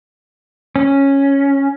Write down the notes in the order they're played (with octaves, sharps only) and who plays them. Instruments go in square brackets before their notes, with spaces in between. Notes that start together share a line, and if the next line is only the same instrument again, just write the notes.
[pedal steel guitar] C#4